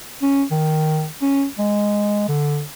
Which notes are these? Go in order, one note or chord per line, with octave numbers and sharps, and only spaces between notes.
C#4
D#3
C#4
G#3
D3